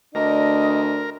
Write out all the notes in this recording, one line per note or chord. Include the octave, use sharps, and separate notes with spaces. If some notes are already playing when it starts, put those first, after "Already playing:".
D2 D4 A#4 D#5